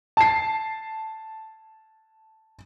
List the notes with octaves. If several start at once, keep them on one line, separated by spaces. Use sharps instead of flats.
A5 C7